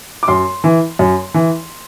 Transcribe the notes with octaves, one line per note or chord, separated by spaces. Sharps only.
D6
F#2 C6
E3
F#2
E3